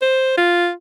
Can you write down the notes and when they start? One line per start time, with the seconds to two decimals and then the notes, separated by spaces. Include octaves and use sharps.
0.02 C5
0.37 F4